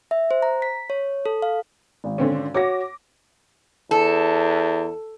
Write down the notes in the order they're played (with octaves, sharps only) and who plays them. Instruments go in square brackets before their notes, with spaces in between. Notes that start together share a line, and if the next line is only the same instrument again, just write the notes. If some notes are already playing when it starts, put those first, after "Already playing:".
[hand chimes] E5
C5
A#5
B6
C#5
A4
F5
[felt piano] G#1
[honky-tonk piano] D3 C4 C#4
[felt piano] F#4 C#5 [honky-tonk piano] D6 A#6
[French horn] E2 [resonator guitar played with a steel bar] A4